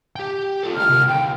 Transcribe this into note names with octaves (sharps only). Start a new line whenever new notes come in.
G4 G5
F4 A4
C#2 G4 F6
C3 A#4
D#2 G5